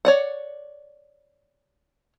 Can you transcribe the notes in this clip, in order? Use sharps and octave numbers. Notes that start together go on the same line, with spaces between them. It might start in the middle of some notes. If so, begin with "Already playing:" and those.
C#5 D5 F#5